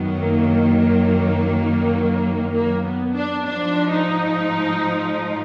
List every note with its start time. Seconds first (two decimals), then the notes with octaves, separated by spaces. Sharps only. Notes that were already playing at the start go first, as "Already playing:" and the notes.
Already playing: F#2 D#3 F#3 B3
0.23 A#3
2.53 A#3
2.84 B3
3.14 D4
3.45 G#2 F3 D4
3.91 D#4